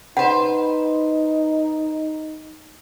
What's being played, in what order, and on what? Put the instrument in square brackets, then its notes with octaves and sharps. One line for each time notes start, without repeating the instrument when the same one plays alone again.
[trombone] D#4 [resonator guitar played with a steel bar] B4 C5 [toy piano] F#5